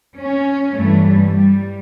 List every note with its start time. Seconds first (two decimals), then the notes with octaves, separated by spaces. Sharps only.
0.19 C#4
0.78 G2 E3 A3
1.08 G3
1.36 G3